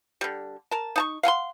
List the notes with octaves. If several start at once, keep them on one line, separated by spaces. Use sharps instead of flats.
D3 G3
A#4 A5
D#4 A5 C#6
F5 F#5 G#5 C6